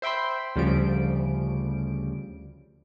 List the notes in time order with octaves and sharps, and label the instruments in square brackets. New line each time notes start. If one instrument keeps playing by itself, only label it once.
[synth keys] C5 E5 G5 B5 C6
D2 C#3 F3 G3 D7